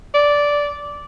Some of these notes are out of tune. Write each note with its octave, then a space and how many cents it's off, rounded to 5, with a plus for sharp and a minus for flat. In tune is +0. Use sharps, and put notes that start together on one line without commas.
D5 -10